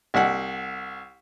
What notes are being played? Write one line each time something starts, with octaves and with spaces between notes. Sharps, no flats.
C2 F#5